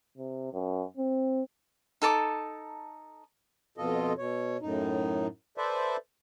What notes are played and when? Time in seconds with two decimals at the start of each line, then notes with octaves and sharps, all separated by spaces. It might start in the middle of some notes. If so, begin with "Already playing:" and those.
0.17 C3
0.53 F#2
0.97 C4
2.02 D#4 A4 A5 D6
3.78 F2 B2 F4 A4 D#5
4.18 B2 C#5
4.62 F#2 A2 D#4
5.58 A4 B4 C5 D5 E5